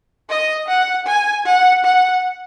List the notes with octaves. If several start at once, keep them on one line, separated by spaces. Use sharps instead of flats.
D#5
F#5
G#5
F#5
F#5